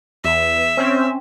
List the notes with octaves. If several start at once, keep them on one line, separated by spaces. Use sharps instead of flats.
E2 E5
C4 C#4